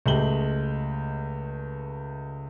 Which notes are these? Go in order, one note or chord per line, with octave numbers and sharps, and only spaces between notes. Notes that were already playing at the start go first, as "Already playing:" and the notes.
C#2 G#3 A3 G4 F#7 G7